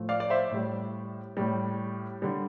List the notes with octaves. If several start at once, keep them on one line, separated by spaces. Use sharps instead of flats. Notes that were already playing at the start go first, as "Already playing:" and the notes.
Already playing: A2 F3 A3
D5 F5
D5
C5 E5
A2 G3
A2 G3
D3 G3